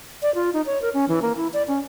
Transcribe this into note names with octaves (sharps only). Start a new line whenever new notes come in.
D5
F4
D#4
C#5
A#4
C#4
E3
A#3
E4
D5
C#4